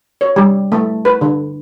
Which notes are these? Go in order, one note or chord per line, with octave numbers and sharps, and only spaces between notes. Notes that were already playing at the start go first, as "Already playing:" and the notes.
C#5
G3
A3
B4
D3